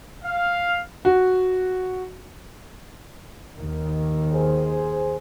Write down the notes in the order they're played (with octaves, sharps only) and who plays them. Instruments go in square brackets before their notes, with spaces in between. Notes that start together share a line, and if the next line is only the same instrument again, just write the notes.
[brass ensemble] F5
[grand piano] F#4
[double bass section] D#2 D#3
[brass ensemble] G#4 C5